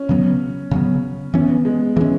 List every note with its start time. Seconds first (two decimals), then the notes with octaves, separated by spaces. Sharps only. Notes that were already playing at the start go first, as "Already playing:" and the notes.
Already playing: C#4
0.09 C#3 F#3 B3
0.71 C#3 F#3 B3
1.34 E3 B3 C#4
1.65 G#3
1.96 E3 G#3 C#4